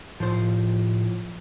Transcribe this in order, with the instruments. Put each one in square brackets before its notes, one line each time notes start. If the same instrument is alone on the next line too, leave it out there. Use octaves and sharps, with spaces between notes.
[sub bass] A2 [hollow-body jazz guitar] F3 C5